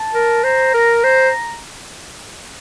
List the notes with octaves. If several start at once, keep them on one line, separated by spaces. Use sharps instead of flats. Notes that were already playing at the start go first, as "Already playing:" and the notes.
Already playing: A5
A#4
C5 A#5
A#4
C5